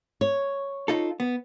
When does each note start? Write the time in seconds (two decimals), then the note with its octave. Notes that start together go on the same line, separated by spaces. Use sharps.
0.21 C#5
0.88 D#4 F4 A4
1.20 B3